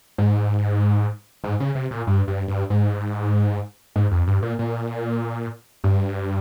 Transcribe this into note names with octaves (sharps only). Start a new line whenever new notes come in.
G#2
G#2
C#3
C3
A#2
G2
G2
G2
G#2
G#2
F2
G2
A#2
A#2
G2